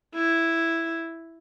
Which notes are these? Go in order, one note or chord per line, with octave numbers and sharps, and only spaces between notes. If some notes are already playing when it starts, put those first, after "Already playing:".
E4